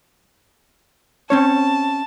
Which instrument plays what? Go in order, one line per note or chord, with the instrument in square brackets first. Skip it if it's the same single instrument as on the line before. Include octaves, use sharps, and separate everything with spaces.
[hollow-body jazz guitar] C4 C#4 C#5 [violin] A5